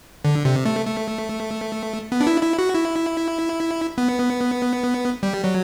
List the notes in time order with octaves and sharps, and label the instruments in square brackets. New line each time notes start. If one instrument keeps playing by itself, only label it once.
[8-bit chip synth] D3
C3
A3
A3
B3
D4
E4
E4
F#4
E4
B3
G3
F#3